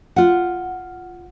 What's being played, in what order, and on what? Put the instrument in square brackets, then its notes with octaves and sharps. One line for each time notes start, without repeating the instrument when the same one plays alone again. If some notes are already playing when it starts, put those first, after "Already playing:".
[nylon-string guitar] F4 F#5